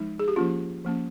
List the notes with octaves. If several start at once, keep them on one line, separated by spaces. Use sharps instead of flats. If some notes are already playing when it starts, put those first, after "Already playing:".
Already playing: F3 G#3 D#4
G#4
G4
F3 A#3 C#4 F4
F3 A#3 C#4